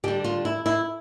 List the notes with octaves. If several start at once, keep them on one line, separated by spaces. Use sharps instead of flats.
D3 G3 G4
F4
E4
E4